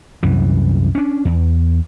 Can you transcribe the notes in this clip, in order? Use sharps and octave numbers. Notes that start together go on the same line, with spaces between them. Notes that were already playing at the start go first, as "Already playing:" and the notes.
C2 F#2 E3
C#4 D4
E2